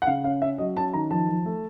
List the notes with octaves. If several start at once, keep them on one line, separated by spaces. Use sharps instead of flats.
F#5
C#3 F5
C#4 F5
C#4 E5
F#3 D#5
C#4 A5
D#3 A#5
F3 A5
F3
A3